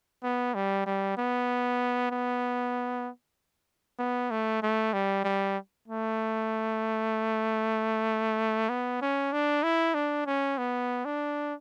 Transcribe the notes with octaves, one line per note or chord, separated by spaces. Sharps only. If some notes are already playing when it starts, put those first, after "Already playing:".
B3
G3
G3
B3
B3
B3
A3
A3
G3
G3
A3
B3
C#4
D4
E4
D4
C#4
B3
D4